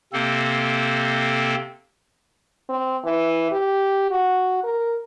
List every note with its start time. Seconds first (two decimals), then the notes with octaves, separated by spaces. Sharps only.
0.13 C3 A#3 C4 A4
2.70 C4
3.05 E3
3.52 G4
4.11 F#4
4.64 A#4